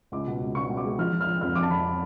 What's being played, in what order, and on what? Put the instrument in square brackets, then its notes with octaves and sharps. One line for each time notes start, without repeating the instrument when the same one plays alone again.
[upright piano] C#2 D6
B2
C#2
B2 C#6
B2
D6
G#3
F3 F6
F3
F6
F3
F2 F6
F2 D6
A5
F2 B5